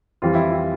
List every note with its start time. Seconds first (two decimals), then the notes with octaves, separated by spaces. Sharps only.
0.22 F2 E3 G3 F4
0.35 E4
0.50 F4